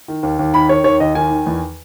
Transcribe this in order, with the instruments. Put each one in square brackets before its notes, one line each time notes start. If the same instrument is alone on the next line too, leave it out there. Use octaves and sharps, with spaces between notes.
[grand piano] D#3
D#2
D#2
D#3 B5
D#3 C#5
D#2 C#5
D#2 D#5
D#3 G#5
D#3
E2